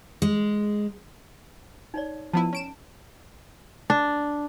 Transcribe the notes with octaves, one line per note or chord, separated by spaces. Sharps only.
G#3
D#4 C#5 D5
F3 B3 E4 A5
C#4 D7 E7
D4